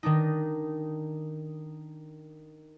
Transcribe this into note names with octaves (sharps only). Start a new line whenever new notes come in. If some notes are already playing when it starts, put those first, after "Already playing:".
D#3 D4 D#4